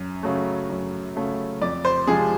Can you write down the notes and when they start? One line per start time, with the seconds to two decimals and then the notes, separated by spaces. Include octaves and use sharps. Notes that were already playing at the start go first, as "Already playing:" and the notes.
Already playing: F#2
0.23 C#3 F#3 A3
0.70 F#2
1.16 C#3 F#3 A3
1.61 F2 D5
1.85 C5
2.07 C3 F3 G#3 G#4